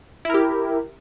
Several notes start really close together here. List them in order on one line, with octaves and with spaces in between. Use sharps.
E4 A#4 G4